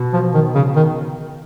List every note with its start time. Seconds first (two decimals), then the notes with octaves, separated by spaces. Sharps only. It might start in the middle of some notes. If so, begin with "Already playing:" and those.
Already playing: B2
0.13 F3
0.34 D#3
0.55 C#3
0.76 D#3